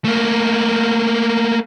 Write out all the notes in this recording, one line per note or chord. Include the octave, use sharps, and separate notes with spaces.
A3 A#3